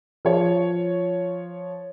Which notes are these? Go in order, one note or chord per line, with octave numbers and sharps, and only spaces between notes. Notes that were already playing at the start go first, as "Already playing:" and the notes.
F3 C#5